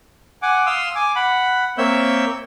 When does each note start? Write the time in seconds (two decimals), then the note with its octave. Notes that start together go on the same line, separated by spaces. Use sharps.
0.42 F#5 G#5 D6
0.66 F5 C6 D#6 E6
0.95 G#5 D6
1.16 F#5 B5
1.78 A#3 C4 C#5 E5 E6 G6